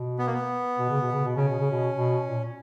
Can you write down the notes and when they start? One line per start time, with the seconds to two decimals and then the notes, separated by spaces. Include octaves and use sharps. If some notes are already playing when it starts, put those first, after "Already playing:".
Already playing: B2
0.19 B3
0.26 A#3
0.33 B3
0.78 B2
0.89 C#3
1.00 B2
1.12 C#3
1.25 B2
1.36 C#3 C#4
1.48 B2
1.59 C#3
1.71 B2
1.96 B2
2.25 A#2